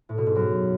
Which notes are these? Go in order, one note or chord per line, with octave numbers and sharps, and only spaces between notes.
A2
B2
G#2
F#2